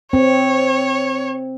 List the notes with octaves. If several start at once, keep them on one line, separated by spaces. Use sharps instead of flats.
C4 C#5